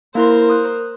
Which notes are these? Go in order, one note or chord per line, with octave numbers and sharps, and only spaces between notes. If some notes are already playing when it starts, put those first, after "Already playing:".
A#3 E4 A#4 C5 C6
D#6 F#6